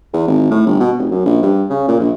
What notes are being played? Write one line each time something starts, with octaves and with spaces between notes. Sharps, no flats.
E2
G#1
A2
G1
B2
F1
F#2
A#1
G2
C#3
A#2
A#1